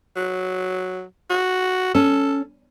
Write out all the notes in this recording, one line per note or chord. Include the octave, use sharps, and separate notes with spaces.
F#3
F#4
C#4 A4